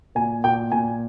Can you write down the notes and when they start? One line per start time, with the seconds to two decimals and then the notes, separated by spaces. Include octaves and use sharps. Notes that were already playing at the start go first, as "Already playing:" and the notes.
0.15 A#2 G#5
0.44 A#2 G5
0.72 A#2 G#5